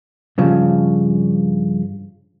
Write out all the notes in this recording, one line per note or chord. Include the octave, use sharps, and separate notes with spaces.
G2 C#3 F3